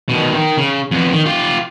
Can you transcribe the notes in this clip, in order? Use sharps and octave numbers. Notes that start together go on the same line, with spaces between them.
B2 D#3
D#3
C#3
F2 B3
D#3
F4 G4